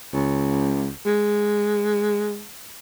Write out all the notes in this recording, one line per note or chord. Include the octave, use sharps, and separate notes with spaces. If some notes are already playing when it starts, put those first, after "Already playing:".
C#2
G#3